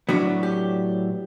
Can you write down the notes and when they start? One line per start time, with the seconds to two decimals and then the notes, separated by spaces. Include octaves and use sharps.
0.09 A2 F#3 B3 D4 F#4
0.43 G4